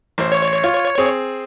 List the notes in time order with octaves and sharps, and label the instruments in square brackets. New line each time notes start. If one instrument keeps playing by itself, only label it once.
[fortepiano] A1 C5
[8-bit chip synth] C#5
[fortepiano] F4
C4 G#4